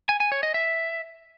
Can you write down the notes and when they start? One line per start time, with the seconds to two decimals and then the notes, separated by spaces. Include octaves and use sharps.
0.09 G#5
0.20 G#5
0.32 C#5
0.43 D#5
0.54 E5